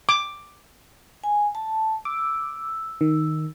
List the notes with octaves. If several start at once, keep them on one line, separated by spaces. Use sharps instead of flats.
D6
G#5
A5
D6 E6
D#3